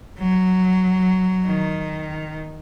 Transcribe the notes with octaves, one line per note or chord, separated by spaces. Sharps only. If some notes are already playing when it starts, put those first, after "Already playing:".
F#3
D#3